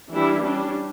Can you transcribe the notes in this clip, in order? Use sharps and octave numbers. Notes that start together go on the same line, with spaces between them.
E3 G3 D4 E4
G3 C#4 D4